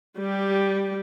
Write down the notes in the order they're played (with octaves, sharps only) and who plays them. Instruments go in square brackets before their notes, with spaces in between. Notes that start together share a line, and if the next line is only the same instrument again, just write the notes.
[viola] G3 G4